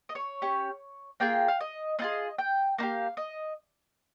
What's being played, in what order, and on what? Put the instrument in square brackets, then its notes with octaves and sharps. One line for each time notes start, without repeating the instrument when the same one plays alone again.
[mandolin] D#5
C#5
C#4 G4
A#3 F4 G#4 G5
F5
D#5
C4 D#5
F4 G#4
G5
A#3 D#4 F5
G4
D#5